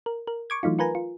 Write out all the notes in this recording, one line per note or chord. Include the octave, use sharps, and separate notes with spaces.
A#4
A#4
C#6 D6 G#6
E3 F#3 A3 D#4 F4
F4 A#4 B4 G#5 A#5
F4